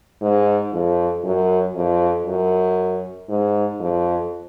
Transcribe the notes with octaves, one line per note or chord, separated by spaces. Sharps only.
G#2
F2
F#2
F2
F#2
G#2
F2